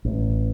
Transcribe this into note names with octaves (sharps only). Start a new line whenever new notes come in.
A1